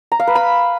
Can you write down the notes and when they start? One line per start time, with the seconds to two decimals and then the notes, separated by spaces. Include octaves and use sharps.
0.12 A#5
0.19 F5
0.27 B4
0.35 B5